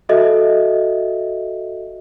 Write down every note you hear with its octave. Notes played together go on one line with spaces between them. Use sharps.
F#4 A4 D#5 E5